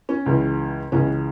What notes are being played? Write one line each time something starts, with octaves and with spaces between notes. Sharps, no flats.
C#4
C#2 C#3 E3
C#2 C#3 E3 C#4